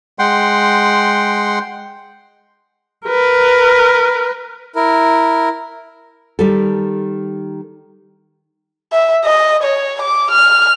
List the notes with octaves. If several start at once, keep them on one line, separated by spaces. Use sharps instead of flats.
G#3 F#5 G5 C6
A#4 B4
E4 A#4
D#3 G3 A4
E5
D#5
C#5
D6
F6